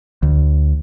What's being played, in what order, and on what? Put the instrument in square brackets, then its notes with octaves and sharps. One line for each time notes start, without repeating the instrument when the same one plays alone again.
[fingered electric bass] D2